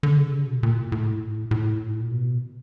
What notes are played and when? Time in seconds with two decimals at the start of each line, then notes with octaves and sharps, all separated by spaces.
0.03 D3
0.17 C#3
0.32 C3
0.47 B2
0.63 A#2
0.77 A2
0.92 A2
1.51 A2
1.99 A#2
2.11 B2